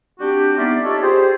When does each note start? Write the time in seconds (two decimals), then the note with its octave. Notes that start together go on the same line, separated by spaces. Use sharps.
0.20 G3 C4 D4 F#4 G4
0.58 G3 B3 D#4 F4 D5 E5
0.83 D#4 F4 G4 A4 C#5 D5
1.02 G4 G#4 C5